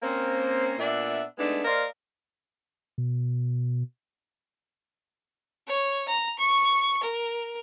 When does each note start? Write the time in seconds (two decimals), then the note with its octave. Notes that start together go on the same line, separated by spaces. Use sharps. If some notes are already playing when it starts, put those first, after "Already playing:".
0.03 A#3 C4 C#4
0.79 A#2 B3 D4 E5
1.38 G#3 A3 B3 D4 D#4
1.64 A#3 A#4 C5 D5 D#5 F5
2.98 B2
5.68 C#5
6.09 A#5
6.39 C#6
7.03 A#4